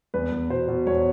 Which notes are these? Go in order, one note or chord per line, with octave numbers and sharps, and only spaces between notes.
E2 B4
E2
B2 C5
B2
E2 C#5